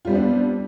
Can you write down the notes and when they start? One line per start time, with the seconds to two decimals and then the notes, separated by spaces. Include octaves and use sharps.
0.05 F4
0.07 G3
0.10 C4
0.12 D4
0.15 B3